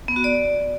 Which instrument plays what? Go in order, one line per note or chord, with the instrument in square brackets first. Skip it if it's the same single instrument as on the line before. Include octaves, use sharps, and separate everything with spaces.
[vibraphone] B3
F#4
D5